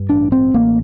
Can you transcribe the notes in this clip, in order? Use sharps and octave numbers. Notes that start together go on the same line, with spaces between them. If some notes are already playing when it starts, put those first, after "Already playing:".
Already playing: G2
A1 D4
C4
A1 A#3